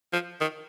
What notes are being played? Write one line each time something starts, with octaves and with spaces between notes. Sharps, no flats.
F3
D#3